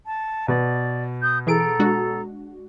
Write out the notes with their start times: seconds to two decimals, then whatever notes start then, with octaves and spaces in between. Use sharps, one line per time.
0.06 A5
0.48 B2 D5
1.22 D#6 G6
1.47 E3 G#4 A4 A#5 D7
1.79 G#3 D4 F#4